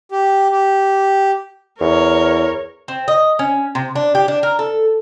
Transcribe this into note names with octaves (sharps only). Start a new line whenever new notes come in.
G4
G4
E2 A#4 C#5
C4
D#5
C#4
C3
D4
G4
D4
A#4
A4